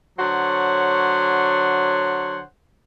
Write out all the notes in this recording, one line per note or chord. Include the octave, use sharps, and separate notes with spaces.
D3 F#3 C5 C#5 F#5